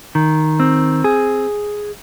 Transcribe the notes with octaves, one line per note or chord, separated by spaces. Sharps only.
D#3
C4
G#4